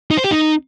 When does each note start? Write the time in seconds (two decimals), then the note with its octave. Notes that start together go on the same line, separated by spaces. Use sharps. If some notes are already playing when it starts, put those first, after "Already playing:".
0.11 D#4
0.18 C5
0.24 G4
0.31 D#4